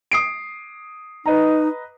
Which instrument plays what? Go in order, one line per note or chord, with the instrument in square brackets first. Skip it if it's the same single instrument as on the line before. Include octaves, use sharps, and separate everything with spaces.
[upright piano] D#6 C7 D7
[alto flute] D#4 [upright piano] B4 D#5 A#5